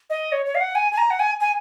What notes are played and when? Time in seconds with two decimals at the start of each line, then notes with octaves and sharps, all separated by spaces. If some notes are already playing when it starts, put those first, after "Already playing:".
0.10 D#5
0.32 C#5
0.46 C#5
0.55 F5
0.61 F#5
0.75 G#5
0.92 G#5
0.97 A#5
1.10 F#5
1.19 G#5
1.40 G#5